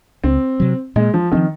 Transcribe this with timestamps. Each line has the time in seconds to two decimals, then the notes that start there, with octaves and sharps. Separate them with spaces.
0.24 C#2 C4
0.60 C3 F#3
0.96 A#2 G#3
1.14 F3
1.31 D#3 F3 C4